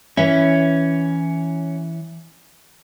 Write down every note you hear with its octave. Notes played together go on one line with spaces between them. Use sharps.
E3 C#4 E4 E5